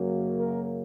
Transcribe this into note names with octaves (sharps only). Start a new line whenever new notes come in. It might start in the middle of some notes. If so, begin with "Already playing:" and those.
Already playing: F#2 C#3 F#3 A#3
A#4